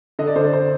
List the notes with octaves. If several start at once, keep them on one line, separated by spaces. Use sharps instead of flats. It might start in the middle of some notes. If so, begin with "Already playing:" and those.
D3 D#5
D5
D3 C5
D5
C5